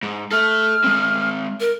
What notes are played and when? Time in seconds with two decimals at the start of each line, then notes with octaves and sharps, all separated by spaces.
0.03 G#2
0.31 A4 E5 F6
0.84 G#3 C4
1.60 A#4